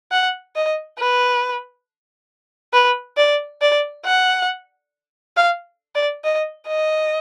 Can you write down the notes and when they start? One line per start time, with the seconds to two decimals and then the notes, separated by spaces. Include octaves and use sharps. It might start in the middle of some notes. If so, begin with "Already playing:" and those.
0.12 F#5
0.56 D#5
0.99 B4
2.74 B4
3.17 D5
3.62 D5
4.06 F#5
5.37 F5
5.95 D5
6.24 D#5
6.68 D#5